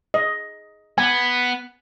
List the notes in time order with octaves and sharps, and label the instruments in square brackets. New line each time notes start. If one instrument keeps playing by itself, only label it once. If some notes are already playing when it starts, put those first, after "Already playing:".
[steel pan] D#5
[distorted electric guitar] B3 [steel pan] G#5